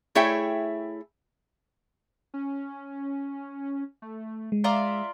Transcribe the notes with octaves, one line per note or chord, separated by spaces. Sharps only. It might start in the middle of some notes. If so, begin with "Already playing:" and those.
A3 E4 G#4 C#5 E5 G5
C#4
A3
G#3
F4 D5 E5 A#5